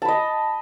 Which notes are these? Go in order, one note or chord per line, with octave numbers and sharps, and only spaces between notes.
D#5 A5 B5